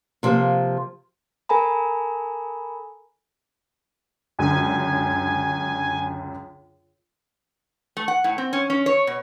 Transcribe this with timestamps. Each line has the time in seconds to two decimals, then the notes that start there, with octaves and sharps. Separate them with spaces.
0.23 C3 F3 A#3
1.49 A4 A#4 G#5 A#5 B5
4.39 C#2 F#2 D3 G#5
7.97 A3
8.08 F#5
8.24 A2
8.38 C4
8.53 C#4
8.70 C#4
8.86 C#5
9.07 B2